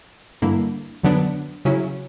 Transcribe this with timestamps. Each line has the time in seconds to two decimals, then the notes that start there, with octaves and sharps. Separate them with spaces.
0.42 G2 D3 A#3 E4
1.03 F#2 D3 F#3 B3 D4
1.65 C#3 F#3 C#4 E4